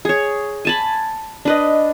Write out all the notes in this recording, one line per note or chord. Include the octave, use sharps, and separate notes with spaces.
G#4 C#5
G#5 A5 B5
D4 B4 D#5